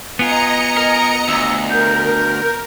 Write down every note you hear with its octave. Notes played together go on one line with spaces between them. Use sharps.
B3 F4 D#5 G#5 A#5 C#7
A#4
D2 E6
A#4 G6